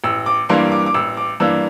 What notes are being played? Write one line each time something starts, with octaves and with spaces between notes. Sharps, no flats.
A1 E6
D6
G2 E3 A#3 D4 C6
D6
D6
A1 E6
D6
G2 E3 A#3 D4 E6